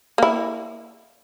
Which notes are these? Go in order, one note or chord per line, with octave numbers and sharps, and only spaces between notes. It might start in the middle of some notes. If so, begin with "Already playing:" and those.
A#3 E4